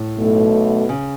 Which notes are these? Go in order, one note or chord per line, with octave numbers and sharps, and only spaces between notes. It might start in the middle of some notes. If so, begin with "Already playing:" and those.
Already playing: A2
B1 B2 A3
C#3